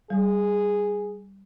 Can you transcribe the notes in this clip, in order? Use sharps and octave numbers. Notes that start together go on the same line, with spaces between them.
G3 G#4